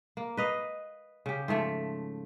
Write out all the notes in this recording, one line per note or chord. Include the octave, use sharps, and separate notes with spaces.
A#3
B4 D#5 F5
C#3 G4
G#2 F3 A3 E5